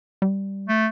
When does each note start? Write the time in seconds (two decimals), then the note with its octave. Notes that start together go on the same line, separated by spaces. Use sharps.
0.22 G3
0.69 A3